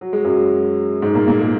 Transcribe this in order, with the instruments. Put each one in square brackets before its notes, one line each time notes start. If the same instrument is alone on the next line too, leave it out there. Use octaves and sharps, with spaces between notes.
[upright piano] F#3
G#3
F#2 F#3
G#2 G#3
A#2 A#3
A#2 A#3
G#3